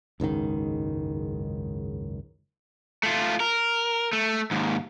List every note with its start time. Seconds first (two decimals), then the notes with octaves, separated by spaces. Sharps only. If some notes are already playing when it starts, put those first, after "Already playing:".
0.20 F#1 C#2 G#2 D#3
3.03 A3 F4
3.40 A#4
4.13 A3
4.51 D#2 G#2